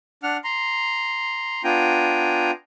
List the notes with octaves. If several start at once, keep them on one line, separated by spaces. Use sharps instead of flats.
D4 F#5 F6
A#5 C6
B3 D4 F4 G5 G#5 A#5